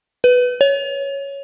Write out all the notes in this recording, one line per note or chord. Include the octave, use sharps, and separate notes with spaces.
B4
C#5